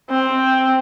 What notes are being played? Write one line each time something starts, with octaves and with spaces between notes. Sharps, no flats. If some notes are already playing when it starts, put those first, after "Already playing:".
C4